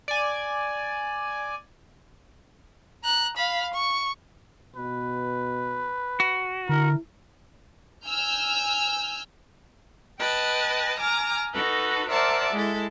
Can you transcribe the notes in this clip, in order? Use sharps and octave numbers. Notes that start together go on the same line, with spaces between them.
D5 G#5
A#5 F#6
F5 B5
C#6
B2 B4
F#4
D3 E4 A#4
G#5 E6 F6 G6
B4 D#5 G5 A5
G#5 A#5 D6 F6
D#4 F#4 A4 B4
A#4 C5 D5 E5 F#5 A5
G#3 E4 A4